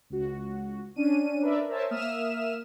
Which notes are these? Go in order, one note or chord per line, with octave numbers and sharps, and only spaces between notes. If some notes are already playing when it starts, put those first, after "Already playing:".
C#2 F#4
C#4 D4 D#7
D4 A#4 B4 D5 E5
A#4 C5 C#5 E5 G#5 A5
A#3 E5 D#6 F6 E7